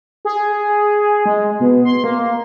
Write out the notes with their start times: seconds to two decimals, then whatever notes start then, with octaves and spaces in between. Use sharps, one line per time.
0.25 G#4
1.26 G#3
1.60 B2
1.85 C6
2.04 A#3